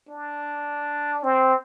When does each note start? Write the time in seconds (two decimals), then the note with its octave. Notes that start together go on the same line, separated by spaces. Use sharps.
0.09 D4
1.24 C4